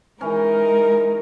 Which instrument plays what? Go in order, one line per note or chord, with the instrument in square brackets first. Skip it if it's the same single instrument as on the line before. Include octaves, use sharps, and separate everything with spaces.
[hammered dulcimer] E3 C#4 [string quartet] G#3 D#4 A#4